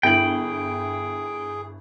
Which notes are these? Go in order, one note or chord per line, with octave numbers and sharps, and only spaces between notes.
G1 E4 G#4 G5 F#7